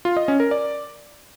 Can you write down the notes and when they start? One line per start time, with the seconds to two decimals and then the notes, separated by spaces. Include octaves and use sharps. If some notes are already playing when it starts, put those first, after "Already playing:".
0.05 F4
0.17 D#5
0.28 C#4
0.40 A#4
0.51 D5